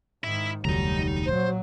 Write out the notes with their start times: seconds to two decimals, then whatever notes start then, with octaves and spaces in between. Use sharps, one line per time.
0.24 G#2 D#3 E4 E5
0.65 F1 D2 F#3 G3 D#4 A#5
1.26 A#2 F#3 C5